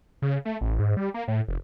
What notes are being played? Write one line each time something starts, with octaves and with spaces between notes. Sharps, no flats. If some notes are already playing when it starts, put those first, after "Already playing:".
C#3
A3
A1
G#2
G3
A#3
A2
F1